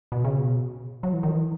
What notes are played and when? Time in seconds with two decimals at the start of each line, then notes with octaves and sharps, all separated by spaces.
0.12 B2
0.24 C#3
0.36 B2
1.03 F#3
1.13 E3
1.23 D#3
1.33 E3